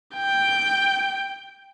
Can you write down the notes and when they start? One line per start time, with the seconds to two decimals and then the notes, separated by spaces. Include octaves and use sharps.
0.15 G5